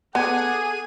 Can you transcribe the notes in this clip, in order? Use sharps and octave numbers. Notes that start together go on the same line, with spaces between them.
B3 D4 G#4 A4 F#5 G#5